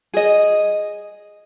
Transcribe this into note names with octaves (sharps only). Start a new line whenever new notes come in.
G#4 D#5